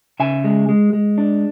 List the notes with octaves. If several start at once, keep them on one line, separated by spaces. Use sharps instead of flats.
C#3 E5 G#5
G#3
G#3
G#3
D4